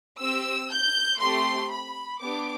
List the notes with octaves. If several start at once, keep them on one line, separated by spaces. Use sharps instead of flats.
C4 G4 E6
G6
A3 C4 G4 C6
B5
B3 D4 G4 D6